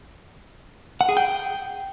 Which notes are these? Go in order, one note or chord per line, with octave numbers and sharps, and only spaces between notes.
F#5
G#4
G5